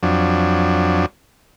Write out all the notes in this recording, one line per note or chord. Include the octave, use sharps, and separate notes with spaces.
F2 F#3 D4